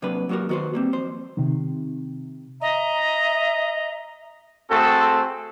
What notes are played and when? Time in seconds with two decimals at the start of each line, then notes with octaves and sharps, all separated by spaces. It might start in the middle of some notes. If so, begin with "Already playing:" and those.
0.02 C3 F#3 A#3 D4 B4 B5
0.29 F#3 A#3 F#4 G4 A#4
0.49 D#3 B3 F#4 B4 C5
0.73 G3 A#3 C4
0.93 F2 C5
1.37 C3 D#3
2.61 D#5 E5 A#5
4.71 A3 C4 F#4 G#4 A4